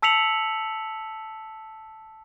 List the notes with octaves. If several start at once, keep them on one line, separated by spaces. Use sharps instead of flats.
A5 E6 B6 C#7 F7 F#7